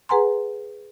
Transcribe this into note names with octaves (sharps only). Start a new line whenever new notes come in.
G#4 B4 F#5 G#5 A#5 C6